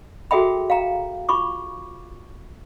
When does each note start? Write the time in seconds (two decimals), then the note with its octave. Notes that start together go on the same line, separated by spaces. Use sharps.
0.31 F#4 G#4 A4 E5 G5 B5
0.70 F5 G5 A#5
1.29 F4 B5 C#6 D6